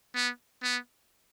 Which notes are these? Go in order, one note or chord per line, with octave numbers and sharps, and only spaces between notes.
B3
B3